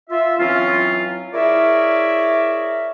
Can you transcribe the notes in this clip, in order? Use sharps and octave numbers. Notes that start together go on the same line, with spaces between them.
F4 E5
E3 F#3 C4 C#4 F4
E4 G#4 A#4 C#5 D5 E5